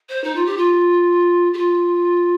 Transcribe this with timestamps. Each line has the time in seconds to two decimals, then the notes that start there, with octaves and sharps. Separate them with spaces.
0.09 C5
0.24 D#4
0.35 F4
0.45 G4
0.58 F4
1.53 G4
1.57 F4